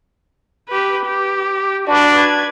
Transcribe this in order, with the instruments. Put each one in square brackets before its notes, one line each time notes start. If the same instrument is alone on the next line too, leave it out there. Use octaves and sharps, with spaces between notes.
[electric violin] G4 B4
G4
[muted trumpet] D4 [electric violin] F#4 B4
[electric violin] B4 G#6